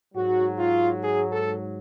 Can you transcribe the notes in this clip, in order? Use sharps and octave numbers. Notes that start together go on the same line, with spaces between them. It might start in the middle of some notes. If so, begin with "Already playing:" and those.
G#2 F#3 F#4
F4
G#4
A4